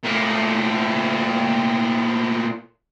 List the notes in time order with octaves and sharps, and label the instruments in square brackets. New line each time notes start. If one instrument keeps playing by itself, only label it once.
[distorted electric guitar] A#2 A3